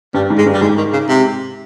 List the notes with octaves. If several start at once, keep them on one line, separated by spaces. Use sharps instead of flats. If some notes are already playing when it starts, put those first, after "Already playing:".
G2 G3
G#2
G#3
G2
G3
G#2 G#3
D#3
C#3
C3